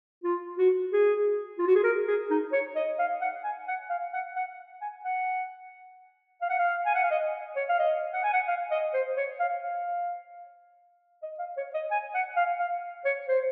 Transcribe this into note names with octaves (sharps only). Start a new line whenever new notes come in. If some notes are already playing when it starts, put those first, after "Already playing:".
F4
F#4
G#4
F4
F#4
G#4
A#4
G#4
D#4
C#5
D#5
F5
F#5
G#5
F#5
F5
F#5
F#5
G#5
F#5
F5
F#5
F5
G#5
F#5
F5
D#5
C#5
F5
D#5
F#5
G#5
F#5
F5
D#5
C5
C#5
F5
F5
D#5
F5
C#5
D#5
G#5
F#5
F5
F5
C#5
C5